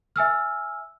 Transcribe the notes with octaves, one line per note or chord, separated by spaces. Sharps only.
E5 G#5 E6 F6